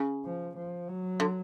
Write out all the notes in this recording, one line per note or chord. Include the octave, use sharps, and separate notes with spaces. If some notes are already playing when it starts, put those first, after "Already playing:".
Already playing: C#3
F3
F3
F#3
D3